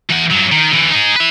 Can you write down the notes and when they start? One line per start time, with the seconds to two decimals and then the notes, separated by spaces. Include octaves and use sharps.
0.10 E3 F#5
0.31 G2 F#3
0.52 D#3
0.71 D3 E3
0.91 D#4 G#4
1.16 B4 E5